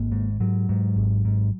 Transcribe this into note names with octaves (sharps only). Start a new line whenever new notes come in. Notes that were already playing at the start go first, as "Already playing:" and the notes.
Already playing: G#1 A#3
G#2
G#2 F#3
G#2
G#1
G#2